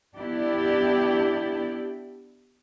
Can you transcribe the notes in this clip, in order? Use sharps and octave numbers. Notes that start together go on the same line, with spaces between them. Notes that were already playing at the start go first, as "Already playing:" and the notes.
B3 D4 E4 G4